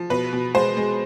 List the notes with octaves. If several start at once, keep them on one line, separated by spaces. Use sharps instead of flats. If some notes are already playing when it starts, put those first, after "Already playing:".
Already playing: F3
B2 B4
B2
G#3 C5
G#3